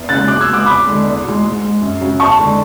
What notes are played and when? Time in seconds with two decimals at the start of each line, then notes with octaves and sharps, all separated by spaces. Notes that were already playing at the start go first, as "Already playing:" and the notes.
Already playing: E2
0.09 C#3 G#3 F#6 A6
0.27 B2 D6 F#6
0.41 E6 G#6
0.48 G#3
0.53 D6 F#6
0.66 E2 B5 D6
0.86 D3 G#3
1.05 E2
1.24 B2 G#3
1.43 G#2
1.62 G#3
1.82 F#2
2.01 C#3 F#3
2.19 E2 A5 C#6
2.39 D3 G#3